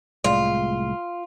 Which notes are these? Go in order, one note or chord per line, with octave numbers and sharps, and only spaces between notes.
C2 A2 G#3 F4